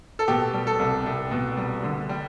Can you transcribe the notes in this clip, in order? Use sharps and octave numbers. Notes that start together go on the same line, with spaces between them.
A4
B2 G4
G3
A4
C2
C2
B2
G3
D3
G3